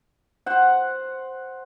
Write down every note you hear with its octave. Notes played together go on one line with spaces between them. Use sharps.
C5 F#5